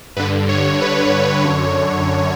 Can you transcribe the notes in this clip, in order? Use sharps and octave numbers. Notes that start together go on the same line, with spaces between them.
G2 D3 B4
C#5
B4
F#2 D3 C#5